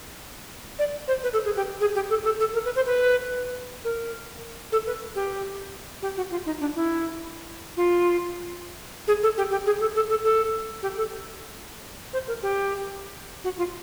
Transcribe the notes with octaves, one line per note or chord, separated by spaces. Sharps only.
D5
C5
B4
A4
G#4
G4
G#4
G4
A4
A4
A4
A#4
B4
C5
B4
A#4
A4
B4
G4
G4
F#4
F4
D#4
D4
E4
F4
G#4
A4
G4
G4
G#4
A4
A4
A4
A4
G4
A4
C5
A#4
G4
F#4
F4